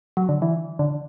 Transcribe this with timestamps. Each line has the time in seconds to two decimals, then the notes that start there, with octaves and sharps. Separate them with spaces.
0.17 F#3
0.29 D3
0.42 E3
0.79 D3